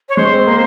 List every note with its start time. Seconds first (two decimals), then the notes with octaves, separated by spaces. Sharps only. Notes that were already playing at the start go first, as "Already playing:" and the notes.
0.09 C#5
0.17 G#3 C5
0.32 C4
0.47 A#3